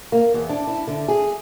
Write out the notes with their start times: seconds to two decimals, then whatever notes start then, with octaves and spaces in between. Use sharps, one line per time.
0.12 A#3
0.34 E2
0.49 D4
0.67 E4
0.87 D3
1.08 G#4